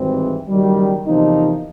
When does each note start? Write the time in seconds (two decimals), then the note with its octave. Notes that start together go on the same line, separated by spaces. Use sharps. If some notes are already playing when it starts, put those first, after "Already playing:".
Already playing: G#1 G2 E3 G#3 C4
0.49 F#1 F#2 D#3 G3
1.06 E2 C3 F3 A#3 D#4